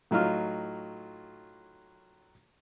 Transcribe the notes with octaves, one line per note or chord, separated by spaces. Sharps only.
A2 F#3 D#4 F4 F6